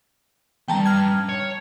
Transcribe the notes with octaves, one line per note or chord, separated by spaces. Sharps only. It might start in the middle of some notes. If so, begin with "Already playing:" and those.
E2 G2 G5 A5 A#5
F6 G#6
C#5